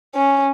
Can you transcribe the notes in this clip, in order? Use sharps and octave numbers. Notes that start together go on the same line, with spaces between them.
C#4